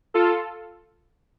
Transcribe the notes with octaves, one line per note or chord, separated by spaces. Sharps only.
F4 A4